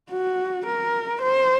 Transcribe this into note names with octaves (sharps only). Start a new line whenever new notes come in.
F#4
A#4
C5